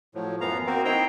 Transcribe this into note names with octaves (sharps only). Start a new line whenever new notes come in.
A2 F3 F#3
F#2 E3 B3 F5 A#5
A#3 C4 F#4 A#4
C4 D#4 E4 C5 G5 A#5